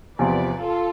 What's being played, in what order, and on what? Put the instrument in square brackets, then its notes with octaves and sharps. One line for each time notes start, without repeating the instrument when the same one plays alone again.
[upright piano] E2 C3 F3 C4 [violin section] B4 D5
[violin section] F4 A4